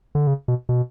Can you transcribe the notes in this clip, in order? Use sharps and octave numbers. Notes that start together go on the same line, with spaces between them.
D3
C#3
B2
B2